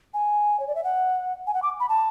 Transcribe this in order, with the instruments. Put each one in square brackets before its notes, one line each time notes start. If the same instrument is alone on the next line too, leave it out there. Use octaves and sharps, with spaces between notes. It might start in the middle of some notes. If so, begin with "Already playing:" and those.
[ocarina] G#5
C#5
D5
E5
F#5
G#5
F#5
D6
B5
A5